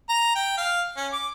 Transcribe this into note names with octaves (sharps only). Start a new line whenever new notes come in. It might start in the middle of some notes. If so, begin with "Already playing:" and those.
A#5
G5
F5
C#4
D6